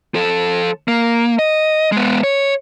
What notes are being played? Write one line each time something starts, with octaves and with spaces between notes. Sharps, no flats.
F3 A4
A#3
D#5
G#3 B3
C#5